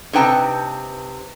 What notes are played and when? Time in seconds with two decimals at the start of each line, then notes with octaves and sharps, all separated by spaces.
0.13 C3 D#4 B4 G5 A5